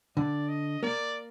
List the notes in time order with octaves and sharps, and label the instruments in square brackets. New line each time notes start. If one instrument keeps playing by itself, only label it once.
[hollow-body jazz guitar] D3 [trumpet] D5
[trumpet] D#5
[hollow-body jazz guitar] A#3 [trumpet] D5